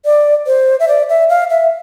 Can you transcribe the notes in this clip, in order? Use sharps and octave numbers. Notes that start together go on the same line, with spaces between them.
D5
C5
E5
D5
E5
F5
E5